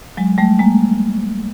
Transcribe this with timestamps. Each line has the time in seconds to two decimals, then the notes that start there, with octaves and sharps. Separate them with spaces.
0.17 F#3 G#3
0.38 G3 A3
0.59 G#3 A#3